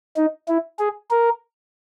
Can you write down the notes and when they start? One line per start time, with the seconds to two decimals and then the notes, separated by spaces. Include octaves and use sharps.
0.17 D#4
0.48 E4
0.79 G#4
1.11 A#4